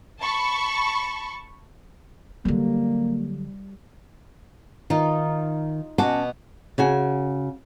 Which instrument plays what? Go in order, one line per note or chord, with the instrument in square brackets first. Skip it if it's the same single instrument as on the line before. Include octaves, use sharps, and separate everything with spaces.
[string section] A5 B5 C#6
[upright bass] D3 F#3 [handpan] G3 [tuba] A#3
[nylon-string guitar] D#3 [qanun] D#4 F4
[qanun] B2 F#4 D6 [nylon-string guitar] C#4 D#5 A5
[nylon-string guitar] C#3 F#4 G#5